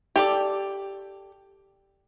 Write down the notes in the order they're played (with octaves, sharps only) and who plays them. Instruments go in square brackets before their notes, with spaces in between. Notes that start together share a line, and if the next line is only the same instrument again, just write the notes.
[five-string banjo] G4 A4 D5